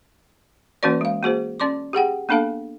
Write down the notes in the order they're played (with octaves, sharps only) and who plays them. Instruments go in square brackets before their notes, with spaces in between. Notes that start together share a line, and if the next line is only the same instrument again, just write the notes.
[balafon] E3 A#3 C#4 F#4 B4 D5
G#3 F5
A#3 F#4 G#4 C5
C#4 D5 C6 D6
G4 G#4 F#5 G5
A#3 B3 D4 A4 F5 A5